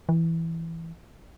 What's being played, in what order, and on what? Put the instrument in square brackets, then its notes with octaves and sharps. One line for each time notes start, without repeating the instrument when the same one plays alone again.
[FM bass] E3